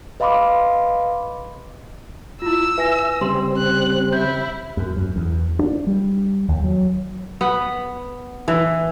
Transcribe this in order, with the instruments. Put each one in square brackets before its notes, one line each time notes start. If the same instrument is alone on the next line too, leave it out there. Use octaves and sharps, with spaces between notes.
[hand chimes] B4 D#5 F5 B5 C6 D6
[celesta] E4 F4 [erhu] E6
[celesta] B4 G#5 A#6 [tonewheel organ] E5
[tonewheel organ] C#3 G3 C4 [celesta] C6
[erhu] F#6
[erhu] E4 [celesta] G6
[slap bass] F#2
F#2
E2
D4
G3
D#2
F#3
[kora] B3
E3